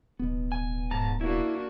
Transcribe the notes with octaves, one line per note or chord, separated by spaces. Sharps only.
D1 B2 B3
G#5
G#2 A5 A#5
A#3 D4 E4 F#4